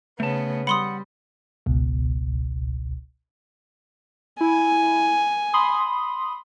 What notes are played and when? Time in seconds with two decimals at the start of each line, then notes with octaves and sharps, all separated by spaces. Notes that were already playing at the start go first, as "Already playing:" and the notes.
0.20 C#3 A3 B3 A5
0.67 G3 F#5 B5 C6 D#6
1.66 G#1 C#2 B2
4.41 E4 G#5
5.54 B5 C6 D#6